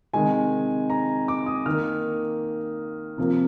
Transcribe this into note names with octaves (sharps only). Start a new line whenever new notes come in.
C3 D#3 G#3 G#5
A#5
D6
D#6
D#3 A#3 F6
C3 F3 A#3